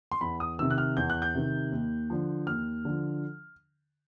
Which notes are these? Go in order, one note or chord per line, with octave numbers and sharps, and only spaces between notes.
C6
E2 B5
D#6
C3 D#3 E6
F#6
F6
E2 G6
F#6
G6
C3 D#3
D#2
D3 F3
D#2 F6
D3 F3